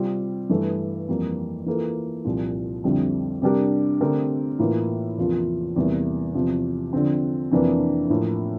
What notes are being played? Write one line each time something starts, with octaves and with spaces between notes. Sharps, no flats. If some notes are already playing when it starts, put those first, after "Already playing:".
Already playing: C3 G3 C4 F4
G2 E3 A3
F2 E3 G3 A#3
E3 A#3 F4 A4
C2 A#2 F3
F2 D3 G3 C4 E4
C3 G3 D4 G4 A#4
D3 A3 C4 G4 A#4
A2 E3 A#3 F4
E2 C3 F3 A#3 F4
E2 C3 G3 A#3 E4
E2 C3 F3
D3 F3 C4
F2 C3 E3 A#3 D4
A2 F3 A#3